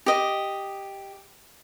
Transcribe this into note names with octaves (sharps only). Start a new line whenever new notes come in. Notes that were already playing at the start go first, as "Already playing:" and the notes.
G4 D#5